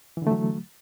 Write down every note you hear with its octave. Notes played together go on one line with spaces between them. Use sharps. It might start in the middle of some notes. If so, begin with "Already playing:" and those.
D3 E3 F#3 A3